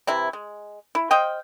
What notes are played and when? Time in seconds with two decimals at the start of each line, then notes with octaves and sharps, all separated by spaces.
0.07 C3 E3 E4
0.33 G#3
0.95 E4
1.11 C5 D#5 F5 G5